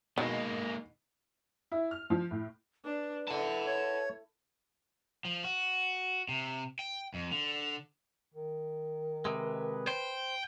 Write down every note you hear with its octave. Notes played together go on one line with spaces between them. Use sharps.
B2 D#3 G#3 A#3
E4
F6
F3
A2
D4 B4
E4 A4 F#5 A5
C#5
F3
F#4
C3
G5
F2
D3
D#3
C3 G#3 B4
C5 G5